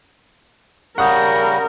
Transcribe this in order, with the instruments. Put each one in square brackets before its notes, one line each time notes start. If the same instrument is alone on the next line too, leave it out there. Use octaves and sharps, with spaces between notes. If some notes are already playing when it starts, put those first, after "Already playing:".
[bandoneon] C#3 G3 [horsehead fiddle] A#4 [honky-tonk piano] F#5 [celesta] C#6 D#6 G6